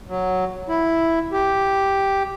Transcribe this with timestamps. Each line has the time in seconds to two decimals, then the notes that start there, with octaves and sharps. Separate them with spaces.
0.08 F#3
0.69 E4
1.32 G4